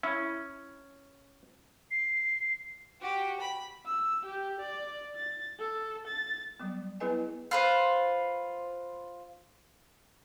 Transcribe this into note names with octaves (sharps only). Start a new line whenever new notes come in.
C#4 E4
C7
F#4 G4
B5
E6
G4
D5
A6
A4
A6
F#3 G3 B3
B3 E4 G#4 B4 D#5 G#5
F4 B4 C5